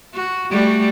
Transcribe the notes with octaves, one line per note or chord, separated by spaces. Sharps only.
F#4
G3 A3 F#4